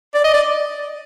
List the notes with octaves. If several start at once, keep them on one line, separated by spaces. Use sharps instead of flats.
D5
D#5
D5